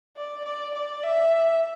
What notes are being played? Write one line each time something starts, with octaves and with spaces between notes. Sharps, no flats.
D5
D5
D5
E5